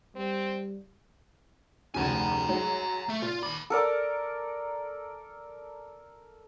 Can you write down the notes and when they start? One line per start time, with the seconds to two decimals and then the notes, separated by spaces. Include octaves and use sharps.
0.16 G3 C4
1.94 F1 D2 C#3 G#5 A#5
2.49 F#3 G#3
3.09 A3 E5
3.22 A#2 F4
3.43 D#2 B5 D6
3.70 A4 A#4 D5